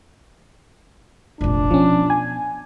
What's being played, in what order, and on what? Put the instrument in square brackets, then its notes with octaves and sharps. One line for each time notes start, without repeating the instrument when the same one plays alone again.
[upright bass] F1 A#1 [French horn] D4
[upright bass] B2 [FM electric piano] F3 C#4
[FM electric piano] G#5